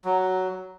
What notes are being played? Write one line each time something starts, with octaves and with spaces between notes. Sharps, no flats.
F#3